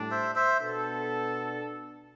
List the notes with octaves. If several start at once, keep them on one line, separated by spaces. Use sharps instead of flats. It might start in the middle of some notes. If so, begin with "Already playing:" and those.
Already playing: A2 G3 D4
C5 E5
C5 E5
B2 B3 D4 A4